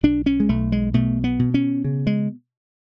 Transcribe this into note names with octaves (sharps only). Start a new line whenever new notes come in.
B1 D4
C#4
G#3
B1 A3
G#3
B2 A3
B3
B2
C#4
C#3
G#3